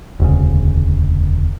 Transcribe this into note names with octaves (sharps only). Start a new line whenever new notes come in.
E1 D2 C#3